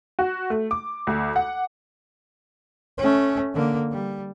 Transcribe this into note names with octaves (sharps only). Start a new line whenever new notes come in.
F#4
A3
D6
D2
F#5
A3 C#4
D3 A#3
G3